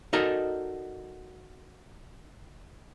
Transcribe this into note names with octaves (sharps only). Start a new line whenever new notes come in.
D#4 F#4 A4 A#4 D5 D#5